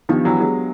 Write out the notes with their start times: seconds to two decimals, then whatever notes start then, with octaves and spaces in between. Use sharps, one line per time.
0.09 D#3 F3 B3 D4 G4
0.25 E3 F#3
0.40 F#3 G#3